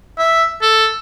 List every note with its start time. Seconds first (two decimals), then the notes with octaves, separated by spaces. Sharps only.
0.18 E5
0.62 A4